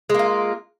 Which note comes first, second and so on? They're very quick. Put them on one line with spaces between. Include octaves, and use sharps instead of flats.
G#3 A#3 F4